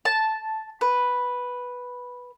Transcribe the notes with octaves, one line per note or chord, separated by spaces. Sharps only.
A5
B4